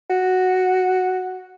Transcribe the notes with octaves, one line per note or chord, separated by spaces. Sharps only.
F#4